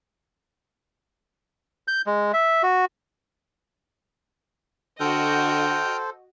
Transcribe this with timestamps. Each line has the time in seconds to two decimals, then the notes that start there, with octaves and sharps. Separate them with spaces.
1.88 G6
2.07 G#3
2.33 E5
2.63 F#4
5.00 D3 F#4 A4 C5 D#5 G5 F6 G6